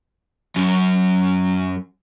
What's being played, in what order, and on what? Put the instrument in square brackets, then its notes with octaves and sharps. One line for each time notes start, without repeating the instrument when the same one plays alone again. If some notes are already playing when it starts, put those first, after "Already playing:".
[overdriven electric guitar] F#2 F#3